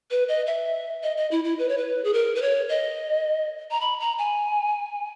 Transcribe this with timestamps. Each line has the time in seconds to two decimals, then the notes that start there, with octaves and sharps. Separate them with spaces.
0.11 B4
0.29 D#5
0.47 E5
1.03 D#5
1.17 D#5
1.31 E4
1.44 E4
1.59 B4
1.69 C#5
1.78 B4
2.04 G#4
2.14 A#4
2.35 B4
2.42 C#5
2.69 D#5
3.71 A#5
3.81 B5
4.00 A#5
4.18 G#5